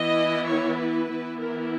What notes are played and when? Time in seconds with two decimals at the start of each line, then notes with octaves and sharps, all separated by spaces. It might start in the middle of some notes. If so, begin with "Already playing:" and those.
Already playing: E3 B3 E4 D#5
0.47 C#5
0.79 B4
1.09 E3 B3 E4
1.40 A#4